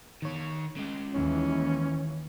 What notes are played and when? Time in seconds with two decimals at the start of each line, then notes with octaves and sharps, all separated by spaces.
0.22 D#3 C#5
0.76 C#3 G#3
1.14 D#2 D#3 E3 C#4